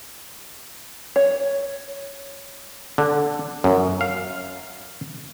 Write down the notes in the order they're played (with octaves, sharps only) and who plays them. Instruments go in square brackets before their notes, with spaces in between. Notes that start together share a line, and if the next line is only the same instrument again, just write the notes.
[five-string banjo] C#5
[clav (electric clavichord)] D3
F#2
F5